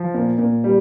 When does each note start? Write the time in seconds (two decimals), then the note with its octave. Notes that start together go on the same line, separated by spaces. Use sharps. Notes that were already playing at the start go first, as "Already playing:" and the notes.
Already playing: F3
0.14 A#2
0.38 A#2
0.64 G3